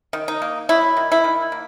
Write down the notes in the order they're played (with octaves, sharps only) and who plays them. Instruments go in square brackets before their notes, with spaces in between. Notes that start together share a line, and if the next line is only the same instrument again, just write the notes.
[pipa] D#3
D#4
A#3
F#3 E4
D#3
E4
D#3
A#3